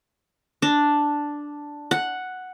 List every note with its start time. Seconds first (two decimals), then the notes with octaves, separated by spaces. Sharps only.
0.62 D4
1.91 F#5